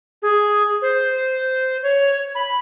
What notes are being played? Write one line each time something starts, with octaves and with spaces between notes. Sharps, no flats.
G#4
C5
C#5
B5